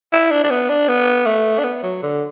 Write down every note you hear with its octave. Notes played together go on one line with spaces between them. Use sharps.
E4
D4
D4
B3
D4
B3
A3
D4
B3
F#3
D3